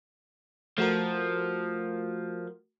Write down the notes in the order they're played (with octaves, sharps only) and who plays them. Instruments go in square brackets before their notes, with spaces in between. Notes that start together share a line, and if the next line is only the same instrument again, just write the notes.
[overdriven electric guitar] F3 [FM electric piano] A3 F#4 A#4